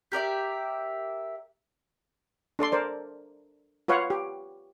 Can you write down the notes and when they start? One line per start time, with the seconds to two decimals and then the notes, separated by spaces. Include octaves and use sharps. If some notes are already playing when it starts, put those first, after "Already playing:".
0.12 G4 A#4 D5 E5
2.59 D4 A4 D5 C6
2.72 A#4 C5 D5
3.88 F4 B4 C#5 F5 F#5
4.10 G4